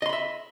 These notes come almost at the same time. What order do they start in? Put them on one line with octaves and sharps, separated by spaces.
D#5 C6 B5 E5